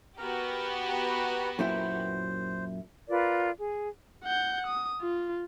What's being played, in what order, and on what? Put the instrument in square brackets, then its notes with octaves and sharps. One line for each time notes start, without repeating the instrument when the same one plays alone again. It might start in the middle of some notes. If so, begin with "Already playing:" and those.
[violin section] B3 F#4 G4 [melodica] A#4 A#5
[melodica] B4 A#5
[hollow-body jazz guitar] F#2 A#2 E4 [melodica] C5
[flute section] F4 A#4 B4 D5
G#4
[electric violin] F#5 G6
D#6
F4